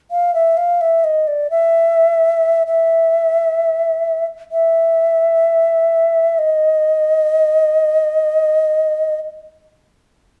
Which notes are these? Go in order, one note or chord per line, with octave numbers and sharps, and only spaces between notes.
F5
E5
F5
E5
D#5
D5
E5
E5
E5
D#5